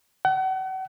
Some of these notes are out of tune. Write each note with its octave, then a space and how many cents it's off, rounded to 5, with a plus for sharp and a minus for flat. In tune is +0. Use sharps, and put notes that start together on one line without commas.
F#5 +40